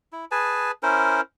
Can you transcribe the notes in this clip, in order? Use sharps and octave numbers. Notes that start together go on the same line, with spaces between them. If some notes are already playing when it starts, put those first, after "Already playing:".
E4
G#4 B4 G#5 A5
C#4 E4 A#4 C5